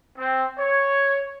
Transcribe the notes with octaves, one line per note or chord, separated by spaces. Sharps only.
C4
C#5